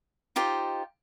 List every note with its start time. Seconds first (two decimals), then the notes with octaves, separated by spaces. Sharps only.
0.36 D#4 F4 G4 C5